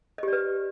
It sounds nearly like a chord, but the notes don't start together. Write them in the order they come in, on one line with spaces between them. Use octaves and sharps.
D#5 G4 D5 B4